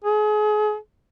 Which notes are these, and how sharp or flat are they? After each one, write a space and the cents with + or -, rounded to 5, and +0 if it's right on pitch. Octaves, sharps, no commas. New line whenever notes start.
G#4 +35